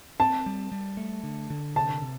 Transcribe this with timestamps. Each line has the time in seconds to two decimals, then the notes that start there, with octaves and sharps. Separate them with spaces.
0.20 C4 A5
0.46 G3
0.72 G3
0.97 A3
1.24 D3
1.50 D3
1.75 C3 A5
2.02 C3